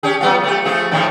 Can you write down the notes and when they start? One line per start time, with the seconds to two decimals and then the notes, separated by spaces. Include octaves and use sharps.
0.03 C#4 G4 G#4
0.21 F#3 B3 F4
0.43 A3 G4
0.65 F3 A3 G#4
0.91 A2 D#3 F3